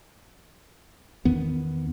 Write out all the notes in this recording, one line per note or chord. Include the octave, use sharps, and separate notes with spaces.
E2 D#3 B3